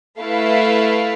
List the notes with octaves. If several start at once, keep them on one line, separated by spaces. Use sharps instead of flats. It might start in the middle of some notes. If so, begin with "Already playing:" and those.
A3 E4 B4 F5